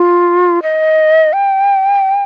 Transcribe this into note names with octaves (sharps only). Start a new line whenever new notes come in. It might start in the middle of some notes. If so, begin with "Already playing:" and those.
Already playing: F4
D#5
G5